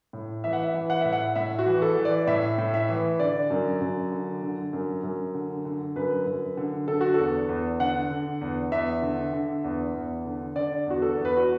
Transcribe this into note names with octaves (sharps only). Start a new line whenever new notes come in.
A2
E3 E5
F#5
E5
E3
F#5
A2 E5
F#5
A2 E5
F#4
E3
A4
E3
D5
A2 E5
A2
E5
E3
D3 D5
F#2
F#2
D3
D3
F#2
F#2
D3
D3
F#2 B4
F#2
D3
D3 A4
F#4
E2 A4
E2
D3 F#5
D3
E2
E2 E5
D3
D3
E2
E2
D3
D3 D5
E2 F#4
A4
E2
B4
F#4